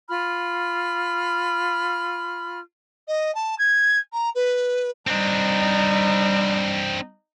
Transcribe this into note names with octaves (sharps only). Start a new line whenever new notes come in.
F4 B5 F6
D#5
A5
G#6
A#5
B4
G3 C4 D4 D#4